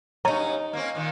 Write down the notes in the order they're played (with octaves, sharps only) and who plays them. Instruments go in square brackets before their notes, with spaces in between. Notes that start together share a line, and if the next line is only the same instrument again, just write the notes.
[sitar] G2 F#3 C#4 [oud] D#4 C#5 [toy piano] A#5
[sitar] A#3 C4 C#4
A#2 D#3 A#3